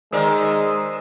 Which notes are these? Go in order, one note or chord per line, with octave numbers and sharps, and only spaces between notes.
D#3 G#3 A#4 C5 D5 D#6 E6